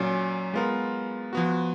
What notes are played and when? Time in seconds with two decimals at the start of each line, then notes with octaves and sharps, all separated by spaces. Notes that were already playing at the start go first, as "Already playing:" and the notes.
Already playing: A#2 F#3 C#4
0.54 G#3 B3 F4 A#4
1.33 F3 B3 F#4